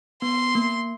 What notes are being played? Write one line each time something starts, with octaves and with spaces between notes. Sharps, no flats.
B3 C6
A#3